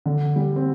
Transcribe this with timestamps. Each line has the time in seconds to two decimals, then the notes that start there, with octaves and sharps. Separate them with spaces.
0.06 D3
0.36 G3
0.56 C4